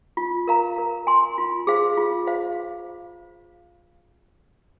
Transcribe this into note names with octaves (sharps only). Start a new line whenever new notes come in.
F4
A#4 F5 A#5
A#4
G#5 C6
F4
G#4 C5 F5
F4
C5 F5